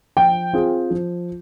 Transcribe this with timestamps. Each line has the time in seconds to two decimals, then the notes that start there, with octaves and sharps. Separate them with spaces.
0.17 F3 G5
0.53 C4 F4 G#4
0.90 F3